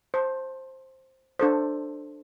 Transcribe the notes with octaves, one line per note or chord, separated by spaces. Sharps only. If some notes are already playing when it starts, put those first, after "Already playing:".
C5 A5
D4 A4 C5